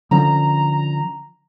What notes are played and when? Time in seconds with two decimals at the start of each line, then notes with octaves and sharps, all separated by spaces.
0.11 D3 F3 C#4 A#5